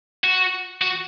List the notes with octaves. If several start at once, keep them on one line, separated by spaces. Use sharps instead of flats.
F#4
F#4